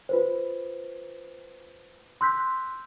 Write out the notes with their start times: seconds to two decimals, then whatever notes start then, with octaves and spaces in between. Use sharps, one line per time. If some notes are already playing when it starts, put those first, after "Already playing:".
0.09 F4 B4 C5
2.21 C6 E6 F#6 G6 B6